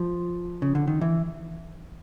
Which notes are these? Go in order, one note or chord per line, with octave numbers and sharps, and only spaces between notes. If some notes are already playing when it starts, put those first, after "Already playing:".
Already playing: F3
C#3
D3
D#3
E3